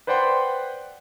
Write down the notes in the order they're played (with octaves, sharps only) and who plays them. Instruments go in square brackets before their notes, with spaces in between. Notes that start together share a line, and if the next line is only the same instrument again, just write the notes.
[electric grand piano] B4 C5 D5 F#5 G5 C6